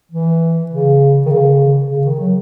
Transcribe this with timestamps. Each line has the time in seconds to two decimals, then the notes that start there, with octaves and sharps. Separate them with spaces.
0.11 E3
0.71 C#3
1.26 D#3
1.30 C#3
1.90 C#3
2.05 D#3
2.20 F#3